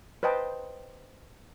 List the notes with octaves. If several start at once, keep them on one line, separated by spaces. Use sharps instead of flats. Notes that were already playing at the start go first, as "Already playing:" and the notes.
B4 C5 D#5 G5 A5